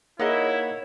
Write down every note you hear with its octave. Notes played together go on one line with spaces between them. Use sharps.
A#3 D#4 E4 G#4 C#5 D#5 F#5